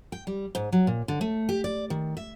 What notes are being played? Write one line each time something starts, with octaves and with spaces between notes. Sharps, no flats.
G5
G3
G#2
F#3
A#2
D3
A3
G4
D5
D#3
E5